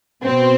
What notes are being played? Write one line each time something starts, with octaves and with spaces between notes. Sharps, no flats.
B2 C4